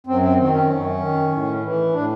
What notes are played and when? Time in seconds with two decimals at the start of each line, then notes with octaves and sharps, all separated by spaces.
0.07 F#2 C4
0.23 C4
0.38 D#3 C4
0.54 C#4
0.70 F#2
1.00 D#3
1.32 A2
1.63 E3
1.94 A2 D4